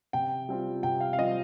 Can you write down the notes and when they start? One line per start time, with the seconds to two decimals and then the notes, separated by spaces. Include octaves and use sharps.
0.13 C3 G5
0.49 G3 C4 F4
0.83 C3 G5
1.00 F5
1.13 F5
1.18 G3 C4 F4 D#5